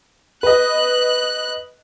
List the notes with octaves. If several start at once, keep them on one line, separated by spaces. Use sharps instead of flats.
B4 D#5 F#6